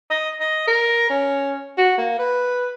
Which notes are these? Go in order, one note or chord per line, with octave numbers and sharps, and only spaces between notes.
D#5
D#5
A#4
C#4
F#4
A#3
B4